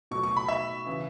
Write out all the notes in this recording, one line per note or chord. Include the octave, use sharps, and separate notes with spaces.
B2 F#3 A3 C#6
C#6
B5
E5
C#3 E3